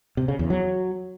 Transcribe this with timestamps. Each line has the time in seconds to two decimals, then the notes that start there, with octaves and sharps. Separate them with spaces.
0.17 C3
0.28 C#3
0.39 E2
0.50 F#3